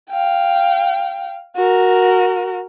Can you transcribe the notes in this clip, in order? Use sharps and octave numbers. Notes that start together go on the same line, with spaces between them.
F5 G5
F#4 A#4